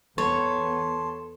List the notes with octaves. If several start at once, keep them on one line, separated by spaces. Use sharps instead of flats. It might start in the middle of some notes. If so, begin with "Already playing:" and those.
E2 B3 A4 C#5 A5 C6